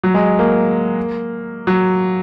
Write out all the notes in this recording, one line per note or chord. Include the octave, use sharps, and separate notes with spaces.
F#3
G#3
A#3
F#3